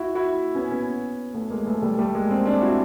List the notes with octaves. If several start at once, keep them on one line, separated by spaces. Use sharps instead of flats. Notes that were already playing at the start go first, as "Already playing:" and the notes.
Already playing: E4 F#4
E4 F#4
B3 C#4
B3 C#4
A3 B3
G#3 A#3
A3 B3
G#3
G3 A3
G3 A3
G#3 A#3
A#3 C4
C4 D4
E4 F#4